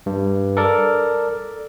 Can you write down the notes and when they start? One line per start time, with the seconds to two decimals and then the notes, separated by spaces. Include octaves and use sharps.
0.06 G2
0.57 A4 A#4 D5